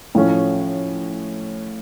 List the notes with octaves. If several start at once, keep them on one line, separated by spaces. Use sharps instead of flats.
A2 F3 A3 C#4